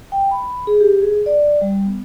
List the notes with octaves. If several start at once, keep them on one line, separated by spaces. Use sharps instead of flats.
G5
B5
G#4
G4
G#4
D5
G3
B3